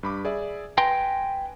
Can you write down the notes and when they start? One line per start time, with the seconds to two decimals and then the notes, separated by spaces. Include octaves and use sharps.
0.03 G2 B5 D6
0.25 G#4 D5 E5
0.78 B4 G5 G#5 A#5 C6 A#6